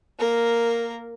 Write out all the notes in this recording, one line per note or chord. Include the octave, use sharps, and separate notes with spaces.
A#3 A#4